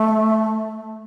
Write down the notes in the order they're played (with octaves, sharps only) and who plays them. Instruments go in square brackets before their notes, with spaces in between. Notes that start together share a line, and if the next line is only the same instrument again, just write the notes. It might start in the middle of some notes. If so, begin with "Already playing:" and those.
Already playing: [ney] A3